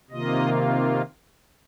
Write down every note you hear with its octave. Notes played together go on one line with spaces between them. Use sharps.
C3 D#3 A#3 F4 D#5